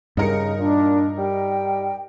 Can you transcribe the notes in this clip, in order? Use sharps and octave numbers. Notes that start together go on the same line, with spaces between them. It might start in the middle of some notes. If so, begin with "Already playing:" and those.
G2 C#3 D#4 A#4 C#7
A#2 D4
G3 G5